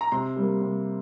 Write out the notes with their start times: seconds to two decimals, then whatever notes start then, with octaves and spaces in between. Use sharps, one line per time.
0.01 A#5
0.12 C3 C6
0.36 G3 A#3
0.62 C3